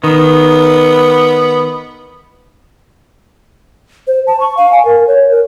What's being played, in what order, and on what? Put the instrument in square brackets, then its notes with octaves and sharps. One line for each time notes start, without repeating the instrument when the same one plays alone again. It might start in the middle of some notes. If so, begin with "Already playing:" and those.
[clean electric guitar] D#3 [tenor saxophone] B3
[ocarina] C5
A5
C#6
F5
G#5
A#4
C#5
A#4